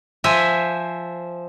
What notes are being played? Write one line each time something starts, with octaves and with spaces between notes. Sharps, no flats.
F3 C5 E5 G#5